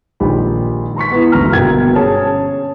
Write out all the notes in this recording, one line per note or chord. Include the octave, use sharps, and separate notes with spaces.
A#1 D#3 G#3 G4 B5
A#5 C6 C#6 B6
B3 E4
F#1 D2 G#2 A#5 F6
G1 B2 A#3 G5 G#6
C#4 G#4 C#5 A5